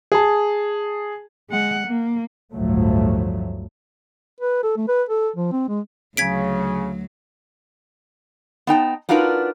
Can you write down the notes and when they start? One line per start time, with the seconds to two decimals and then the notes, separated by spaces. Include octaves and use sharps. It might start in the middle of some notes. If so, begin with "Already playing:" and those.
0.12 G#4 A5
1.50 G#3 F#5
1.87 A#3
2.53 G1 D2 A2 F3 F#3 A3
4.41 B4
4.63 A4
4.77 A3
4.88 B4
5.09 A4
5.36 F3
5.52 C4
5.69 G#3
6.17 D2 C#3 F#3 G#6 B6 D7
8.67 B3 D#4 G5 A5
9.09 D4 D#4 F4 F#4 A#4 B4